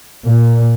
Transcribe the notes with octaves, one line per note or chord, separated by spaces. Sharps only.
A#2